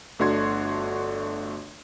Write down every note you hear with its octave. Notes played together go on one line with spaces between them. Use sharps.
G1 A3 D4 F#4 C6 G#6